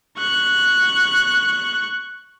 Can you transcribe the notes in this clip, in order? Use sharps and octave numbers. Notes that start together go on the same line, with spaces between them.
C#6 F#6